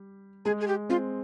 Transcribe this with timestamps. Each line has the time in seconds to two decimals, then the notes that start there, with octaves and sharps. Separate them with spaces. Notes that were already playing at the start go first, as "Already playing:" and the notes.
Already playing: G3
0.45 G#3 G#4
0.61 G#4
0.68 G4
0.89 C4 F4